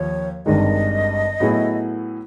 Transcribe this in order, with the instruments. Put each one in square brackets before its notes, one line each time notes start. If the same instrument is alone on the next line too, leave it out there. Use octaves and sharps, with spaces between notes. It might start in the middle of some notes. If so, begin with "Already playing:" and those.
Already playing: [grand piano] D#2 F3 [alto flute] C#5
[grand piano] G#1 G2 D#3 G#3 [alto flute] D#5
[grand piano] A2 F#3 B3 E4 G#4